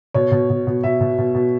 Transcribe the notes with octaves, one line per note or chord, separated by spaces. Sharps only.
B2 C#5
B2
B2
B2
B2 E5
B2
B2
B2